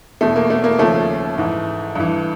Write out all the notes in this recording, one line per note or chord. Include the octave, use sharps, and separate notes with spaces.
E2 B2 A3
A#3
A3
A#3
D#2 C#3 F3 A3
G#2 E3
G2 E3